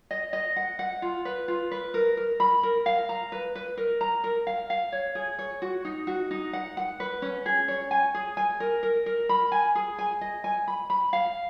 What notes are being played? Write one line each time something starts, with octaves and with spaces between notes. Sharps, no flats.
D#5
D#5
F#5
F#5
F4
B4
F4
B4
A#4
A#4
B5
A#4
F5
A#5
B4
B4
A#4
A#5
A#4
F5
F5
C#5
G#4
C#5
F#4
D#4
F#4
D#4
F#5
F#5
B4
C#4
G#4
C#5
G#5
G#4
G#5
A#4
A#4
A#4
B5
G#5
G#4
G#5
D#5
G#5
B5
B5
F5